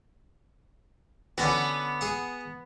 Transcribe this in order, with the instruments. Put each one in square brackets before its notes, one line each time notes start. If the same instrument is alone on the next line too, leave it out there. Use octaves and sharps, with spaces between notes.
[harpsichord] D3 C#4 F#4 [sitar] B3
[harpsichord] G#4 F#5